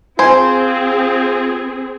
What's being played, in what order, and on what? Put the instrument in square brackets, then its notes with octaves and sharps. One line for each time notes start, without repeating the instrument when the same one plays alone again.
[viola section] C4 G#4 [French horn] F4 [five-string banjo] C5 [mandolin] G#5